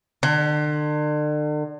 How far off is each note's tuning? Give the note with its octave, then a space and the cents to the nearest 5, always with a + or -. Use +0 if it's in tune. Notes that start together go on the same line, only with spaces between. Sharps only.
D3 +40